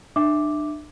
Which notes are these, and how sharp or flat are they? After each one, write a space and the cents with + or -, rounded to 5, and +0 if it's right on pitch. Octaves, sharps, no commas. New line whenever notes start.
D4 +35 E5 +0 D6 +0